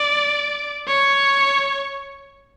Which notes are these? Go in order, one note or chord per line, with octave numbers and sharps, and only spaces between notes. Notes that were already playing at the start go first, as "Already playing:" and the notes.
Already playing: D5
C#5